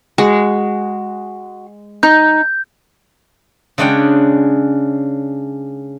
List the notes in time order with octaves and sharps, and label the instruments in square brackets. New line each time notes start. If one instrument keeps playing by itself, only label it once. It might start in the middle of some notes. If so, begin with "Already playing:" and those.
[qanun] G#3 [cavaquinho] F#4
[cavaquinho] D#4 [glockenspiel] G6
[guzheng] C#3 G#3 C#4 D4 F#5 G5